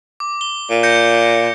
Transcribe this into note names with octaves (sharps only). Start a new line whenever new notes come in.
D6
G7
A#2
G6 A#6 C#7